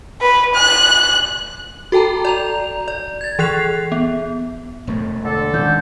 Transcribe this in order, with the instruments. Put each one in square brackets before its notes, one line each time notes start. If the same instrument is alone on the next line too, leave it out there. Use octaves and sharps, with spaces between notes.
[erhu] B4
F#6
[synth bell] F#4 A4 G5 A5 A#5
D5 A#5 F7
D5
G#6 A6
E3 G#4 F#6 C7 F7
B3
[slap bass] E1 F2 A3
[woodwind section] D3 A4
[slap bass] D#3 G#3 C#4 [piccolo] G6